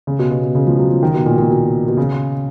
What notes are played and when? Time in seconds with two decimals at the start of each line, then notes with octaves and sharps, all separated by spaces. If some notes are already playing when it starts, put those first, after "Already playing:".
0.07 C#3
0.19 B2
0.31 B2
0.43 B2
0.55 C#3
0.67 F3
0.79 F#3
0.90 F3
1.03 D#3
1.14 B2
1.26 A#2
1.38 A#2
1.50 B2
1.88 B2
1.97 C#3